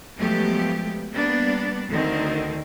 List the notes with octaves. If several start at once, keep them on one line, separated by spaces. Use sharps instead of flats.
F3 F#3 G#3 A3 B3 G4
G3 A#3 B3 D4
D2 D3 D#3 C4